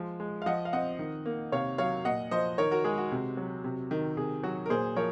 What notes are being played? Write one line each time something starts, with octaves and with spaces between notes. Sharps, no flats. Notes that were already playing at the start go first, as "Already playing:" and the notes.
Already playing: F3 G#3
G#3
F5
F3 D#5 F#5
F5
C4 D#5 F#5
D#3
A#3
C3 C#5 F5
F#3 C#5 F5
A#2 D#5 F#5
F3 C5 D#5
D#3 A#4 C#5
F#4 A#4
G#3 G#4
F#4
C3
F#3
C3
D#3
C3 G#4
F#3 F#4
A#4
A#2 G#4 C5
F3 A#4 C#5